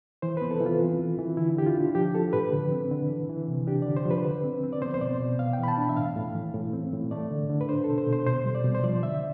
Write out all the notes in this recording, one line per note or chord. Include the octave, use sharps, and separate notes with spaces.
E3 C5
B3 B4
A4
E3
F4
C4
E3
E3
D3 E4
D3 G4
F4
D4
F3 G4
F3 A4
A2 B4
D3
C4
D3
E3
E3
C3
D4 G4
D3 D5
C5
F3
B4
D3
C4
C4
D5
B3 C5
C5
B2 D5
B2
B3 F5
E3 G5
B5
A5
D4
E5
A2 F5
A2
E3
A2
C4
A2
A3 D5
D3
D3
B4
D4 C5
B2 A4
C5
B2
C5
B2 C5
G3
D5
B2
C5
F3 D5
D3 E5